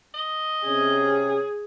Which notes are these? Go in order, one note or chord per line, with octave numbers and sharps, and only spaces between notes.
D#5
C3 C#4 G#4